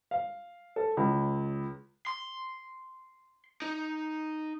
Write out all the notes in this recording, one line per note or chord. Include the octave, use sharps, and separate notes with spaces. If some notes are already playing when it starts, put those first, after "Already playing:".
F5
A4
C#2
C6
D#4